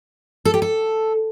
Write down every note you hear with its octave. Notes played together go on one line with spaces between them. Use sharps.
A4
G4
A4